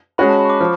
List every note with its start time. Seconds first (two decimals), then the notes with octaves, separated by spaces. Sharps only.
0.18 G#3 C#4 F#4 B5
0.29 A5
0.39 B5
0.45 C#6
0.50 D6
0.60 F3 F6